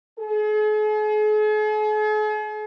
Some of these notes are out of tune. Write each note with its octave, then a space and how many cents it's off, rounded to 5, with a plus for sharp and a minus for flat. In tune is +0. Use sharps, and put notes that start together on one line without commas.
G#4 +45